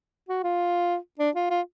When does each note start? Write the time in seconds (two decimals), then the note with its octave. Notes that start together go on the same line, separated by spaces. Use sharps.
0.29 F#4
0.44 F4
1.19 D4
1.36 F4
1.51 F4